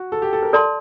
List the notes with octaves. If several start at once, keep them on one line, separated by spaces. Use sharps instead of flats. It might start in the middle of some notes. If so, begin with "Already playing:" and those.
Already playing: F#4
A4
G4
A4
A#4
A4 D5 A5 C6